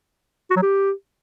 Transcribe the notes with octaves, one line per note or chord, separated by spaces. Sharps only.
F#4
F#3
G4